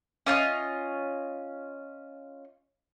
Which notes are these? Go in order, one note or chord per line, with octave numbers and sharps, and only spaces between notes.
C#4 F4 C5 D#5